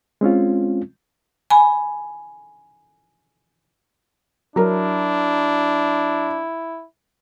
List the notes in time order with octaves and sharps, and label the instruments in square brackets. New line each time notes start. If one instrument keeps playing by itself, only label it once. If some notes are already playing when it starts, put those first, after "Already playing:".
[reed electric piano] G#3 C4 C#4 F4
[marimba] G#5 B5
[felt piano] F#3 A#4 [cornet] D4 [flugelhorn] E4